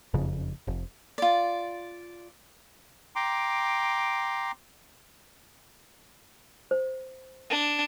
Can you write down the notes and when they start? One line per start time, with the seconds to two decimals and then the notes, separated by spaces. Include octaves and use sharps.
0.14 F#1 F2 C#3
0.67 F1
1.18 F4 D5
3.16 G5 A#5 C6 D6
6.71 C5
7.50 D4